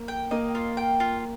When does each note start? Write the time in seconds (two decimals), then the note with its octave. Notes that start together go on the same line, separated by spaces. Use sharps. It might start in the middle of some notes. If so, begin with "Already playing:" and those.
Already playing: A#3
0.08 G5
0.31 A#3 D#5
0.55 F4
0.77 G5
1.00 F4